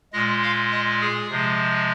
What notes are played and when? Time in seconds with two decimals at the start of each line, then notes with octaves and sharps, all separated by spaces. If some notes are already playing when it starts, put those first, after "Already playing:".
0.13 A#2 G#3 D#5
0.43 F5
0.71 D#5
1.01 G#4
1.30 C3 F3 G#3